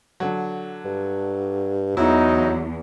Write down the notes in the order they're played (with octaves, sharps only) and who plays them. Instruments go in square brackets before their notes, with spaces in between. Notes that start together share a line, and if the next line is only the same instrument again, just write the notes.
[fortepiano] D3 F#3
[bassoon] G2
[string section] E2 [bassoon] F#3 [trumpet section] D#4 [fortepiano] E4